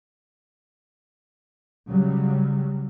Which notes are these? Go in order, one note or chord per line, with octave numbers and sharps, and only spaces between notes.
C#3 F#3 G3